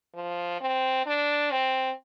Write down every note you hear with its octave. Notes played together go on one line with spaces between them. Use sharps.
F3
C4
D4
C4